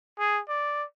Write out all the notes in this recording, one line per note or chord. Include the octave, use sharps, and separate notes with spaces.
G#4
D5